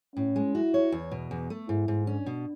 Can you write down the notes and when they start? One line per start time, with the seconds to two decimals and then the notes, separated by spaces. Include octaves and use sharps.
0.16 A2 C#4
0.36 G#3
0.55 E4 F#4
0.74 C#5
0.92 E2
1.11 B2
1.31 E2
1.50 A3
1.68 G#2 E4
1.88 G#2
2.07 C#4 D4
2.26 B2